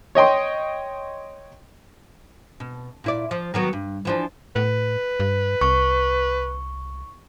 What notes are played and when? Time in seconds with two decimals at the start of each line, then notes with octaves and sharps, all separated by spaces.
0.15 C#5 D#5 G5 C6
2.60 B2
3.04 A#2 E4 D5
3.31 F3
3.54 D#3 F#3 B3
3.73 G2
4.05 E3 F3 D4
4.56 A2 B4
5.20 G2
5.61 C2 C#6